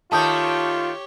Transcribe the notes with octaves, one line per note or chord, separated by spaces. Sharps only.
D#3 A3 F4 G4 C#5 A5 D#6 G6